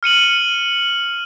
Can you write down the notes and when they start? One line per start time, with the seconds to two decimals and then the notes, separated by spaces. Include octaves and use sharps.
0.03 F6 C#7 D#7 F#7